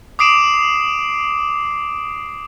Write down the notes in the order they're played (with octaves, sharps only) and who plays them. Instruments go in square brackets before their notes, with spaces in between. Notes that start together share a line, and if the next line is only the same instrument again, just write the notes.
[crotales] D6 D#6 C7 D7 E7